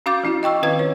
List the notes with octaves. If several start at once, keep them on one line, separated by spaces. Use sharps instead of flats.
C#4 F#4 F5 D6 G6 A6
F3 C#4 E4 F#4
D#5 G5 C#6 E6
D#3 C4 F4 B4 F5 G#6
B4 C#5